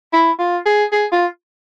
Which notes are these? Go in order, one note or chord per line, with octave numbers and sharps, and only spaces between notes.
E4
F4
G#4
G#4
F4